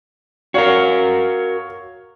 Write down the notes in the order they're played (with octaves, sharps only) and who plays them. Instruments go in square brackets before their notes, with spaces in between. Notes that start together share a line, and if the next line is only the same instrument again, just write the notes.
[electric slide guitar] F#4 A#4 [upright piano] C#5 F5